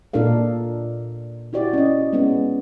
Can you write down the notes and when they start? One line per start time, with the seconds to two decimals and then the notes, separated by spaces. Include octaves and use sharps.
0.13 A#2 D4 A4 A#4 F5
1.53 E4 F#4 G4 D5
1.73 C#4 D#5
2.13 G#3 B3 C#4